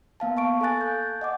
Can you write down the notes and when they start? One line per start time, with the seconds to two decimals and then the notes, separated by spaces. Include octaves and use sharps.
0.20 A#3 B3 F5 A5
0.37 A5 C#6 D7
0.61 A4 F5 G#5 F#6 A6
0.81 G6
1.21 D#5 F#5 D6